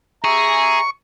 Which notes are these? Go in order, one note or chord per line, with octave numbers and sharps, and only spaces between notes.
G#4 E5 A#5 C#6